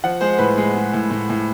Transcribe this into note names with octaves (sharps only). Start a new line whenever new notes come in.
F3 F#5
G#3 C5
A2 B4
G#3
G#3
A2
A2
A2